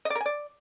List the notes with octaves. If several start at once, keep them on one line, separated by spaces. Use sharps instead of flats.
D#5
D5
A#4
G#5
D5